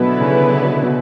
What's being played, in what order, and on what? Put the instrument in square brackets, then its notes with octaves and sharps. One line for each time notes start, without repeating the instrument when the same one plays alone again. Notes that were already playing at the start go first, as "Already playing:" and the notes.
Already playing: [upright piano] B2 [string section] D3 F#3 B3 E4 B4
[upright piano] C#3
B2
B2